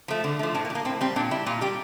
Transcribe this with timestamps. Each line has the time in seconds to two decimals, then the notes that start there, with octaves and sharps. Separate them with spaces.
0.08 F3 A3
0.24 D3
0.39 F3 A3
0.54 A2 D4
0.65 A#3
0.70 G3
0.75 A#3
0.85 A2 C4
1.01 G3 C4
1.16 A#2 D4
1.31 G3 E4
1.46 A#2 F4
1.61 G3 G4